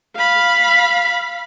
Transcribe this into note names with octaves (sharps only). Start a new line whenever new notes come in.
F5 B5